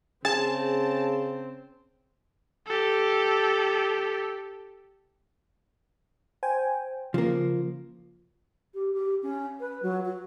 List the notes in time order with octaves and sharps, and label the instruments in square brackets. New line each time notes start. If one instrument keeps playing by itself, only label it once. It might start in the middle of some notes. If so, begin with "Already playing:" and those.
[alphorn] C#3 [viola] C4 [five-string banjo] G#4 [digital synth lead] A5
[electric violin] G4 A4
[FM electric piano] C5 G5 G#5
[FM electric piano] C#3 [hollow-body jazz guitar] F3 A#3
[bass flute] G4
G4
C#4
B4
F#3
F#4